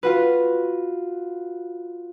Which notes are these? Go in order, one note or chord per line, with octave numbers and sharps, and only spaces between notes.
F4 F#4 B4